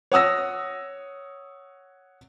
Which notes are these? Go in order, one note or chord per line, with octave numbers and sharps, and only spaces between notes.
C#5 F#5 D#6 E6 A#6